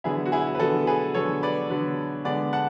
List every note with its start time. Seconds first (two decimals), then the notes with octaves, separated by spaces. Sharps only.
0.04 D3 F#3 B3 E4 G#4
0.26 F#4
0.32 E4 G#4
0.55 B4
0.59 D3 F#3 B3 F#4 A4
0.87 G#4 B4
1.14 D3 F#3 B3 A4 C#5
1.43 B4 D5
1.70 D3 F#3 B3
2.25 D3 G#3 B3 D5 F#5
2.53 F#5 A5